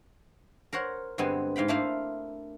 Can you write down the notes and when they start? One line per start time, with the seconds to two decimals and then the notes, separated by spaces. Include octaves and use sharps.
0.73 A#4 C5 C#5 F#5
1.18 G2 D3 G#3 B3 C4 G#5
1.56 G#2 F5 G5 B5
1.68 A3 A#3 D4 E4 C5 F5